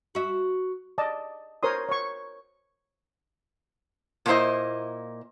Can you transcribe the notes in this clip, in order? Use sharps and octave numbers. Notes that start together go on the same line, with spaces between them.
F#4 E5
D5 D#5 A5
A#4 C5 C#5 C6 D#6
C#5 C#6
A#2 A#3 D4 E4 C5 D#5